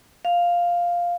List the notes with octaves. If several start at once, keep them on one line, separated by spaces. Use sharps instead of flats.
F5